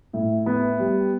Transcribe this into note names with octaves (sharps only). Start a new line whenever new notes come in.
A2
B3
G3